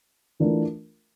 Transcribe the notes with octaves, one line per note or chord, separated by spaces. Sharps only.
E3 A3 D4 F4 A#4